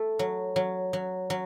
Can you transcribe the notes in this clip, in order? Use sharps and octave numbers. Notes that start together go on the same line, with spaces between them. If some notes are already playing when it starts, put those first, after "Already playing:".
Already playing: A3
F#3
F#3
F#3
F#3